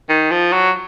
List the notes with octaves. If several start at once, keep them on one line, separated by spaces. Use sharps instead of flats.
D#3
F3
F#3